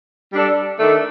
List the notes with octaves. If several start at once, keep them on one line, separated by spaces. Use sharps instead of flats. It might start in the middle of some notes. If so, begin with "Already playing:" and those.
G3 D4 A4
D#3 A3 D4